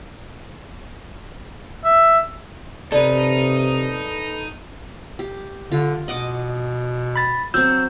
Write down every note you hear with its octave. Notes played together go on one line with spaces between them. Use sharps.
E5
C3 D#4 A4 B4 D5
G4
D3 F4
B2 D#5 F#5 D6
B5 A6
F#3 C4 E6 G6